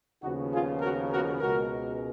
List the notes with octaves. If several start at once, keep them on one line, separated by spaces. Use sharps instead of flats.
D#2 C#3 F3 B3 D#4 F#4
F4 G#4
F#4 A#4
F#4 A#4
C#2 B2 G#3 F#4 A#4